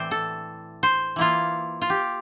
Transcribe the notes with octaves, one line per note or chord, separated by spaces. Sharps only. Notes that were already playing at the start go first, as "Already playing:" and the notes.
Already playing: A2 E3 A3 C4 C5 D5
A4
C5
E3 A#3 E4 F4
F4
G4